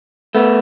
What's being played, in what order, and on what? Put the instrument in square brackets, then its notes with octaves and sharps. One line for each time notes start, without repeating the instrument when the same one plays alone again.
[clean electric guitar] A3 B3